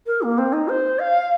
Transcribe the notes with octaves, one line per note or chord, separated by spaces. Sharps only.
A#4
A#3
C4
D#4
C5
F5